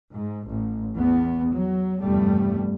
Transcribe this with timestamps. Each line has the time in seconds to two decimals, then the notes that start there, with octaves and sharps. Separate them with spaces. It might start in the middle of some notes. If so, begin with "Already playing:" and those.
0.14 G#2
0.49 A1
0.96 E2 B3
1.53 F#3
2.01 F1 E2 G2 G3 A3